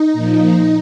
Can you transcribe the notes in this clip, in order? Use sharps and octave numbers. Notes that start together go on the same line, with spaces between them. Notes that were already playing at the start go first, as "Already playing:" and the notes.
Already playing: D#4
A#2 F3